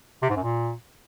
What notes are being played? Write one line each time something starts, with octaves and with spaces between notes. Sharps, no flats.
C3
G#2
F#2
A#2